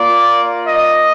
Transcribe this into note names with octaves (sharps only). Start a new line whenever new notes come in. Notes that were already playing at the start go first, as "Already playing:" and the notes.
Already playing: A#3 F4 D5
D#5